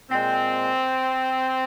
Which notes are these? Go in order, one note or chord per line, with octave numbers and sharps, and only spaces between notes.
A#2 G#3 C4